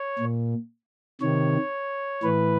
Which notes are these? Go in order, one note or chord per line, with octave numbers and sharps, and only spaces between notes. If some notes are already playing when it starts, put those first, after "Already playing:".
Already playing: C#5
A#2
C3 D#3 C#5
A2 E3 B4